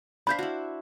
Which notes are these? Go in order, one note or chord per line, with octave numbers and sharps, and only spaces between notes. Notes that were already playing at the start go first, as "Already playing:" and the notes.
D4 C5 F5 B5 G6 B6
E4 F#4